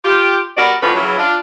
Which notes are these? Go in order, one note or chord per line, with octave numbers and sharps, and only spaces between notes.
F4 G4
G3 B3 F#4 A#4 D5
F2 A2 D3 C#4 F4 B4
C#3 E3 F#3
D4 F4